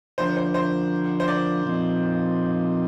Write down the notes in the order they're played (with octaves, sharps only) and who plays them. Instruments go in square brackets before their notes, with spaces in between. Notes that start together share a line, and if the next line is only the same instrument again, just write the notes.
[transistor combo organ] D3 F3 A#3 D4 [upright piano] C5
[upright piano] C5
C5
C5
D5
[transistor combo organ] A#2 F3 C4 D#4